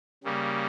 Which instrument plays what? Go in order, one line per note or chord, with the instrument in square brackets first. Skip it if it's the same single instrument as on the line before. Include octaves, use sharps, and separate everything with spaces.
[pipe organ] C#3 G3 A#3